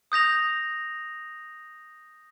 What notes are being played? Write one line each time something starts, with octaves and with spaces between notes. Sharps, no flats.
D#6 G6 A#6 F7